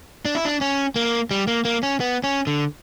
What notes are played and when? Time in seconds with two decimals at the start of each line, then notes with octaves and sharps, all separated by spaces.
0.25 D4
0.35 E4
0.45 D4
0.61 C#4
0.96 A#3
1.31 G3
1.47 A#3
1.65 A#3
1.83 C#4
2.00 B3
2.24 C#4
2.47 D3